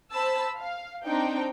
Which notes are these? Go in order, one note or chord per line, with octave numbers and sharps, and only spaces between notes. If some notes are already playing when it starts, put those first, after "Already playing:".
C5 A5 B5 E6
F5
C4 D4 D#4 G5